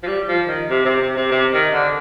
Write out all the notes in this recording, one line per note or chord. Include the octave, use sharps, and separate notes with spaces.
F3
G3
F3
D#3
C3
C3
C3
C3
C3
D#3
D3